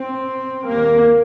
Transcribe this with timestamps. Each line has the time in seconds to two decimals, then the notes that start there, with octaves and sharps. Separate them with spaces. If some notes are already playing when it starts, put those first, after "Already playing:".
Already playing: C4
0.66 D#2 A#3